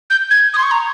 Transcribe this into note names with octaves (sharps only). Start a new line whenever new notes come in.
G6
G#6
D#6
C6
C#6
A#5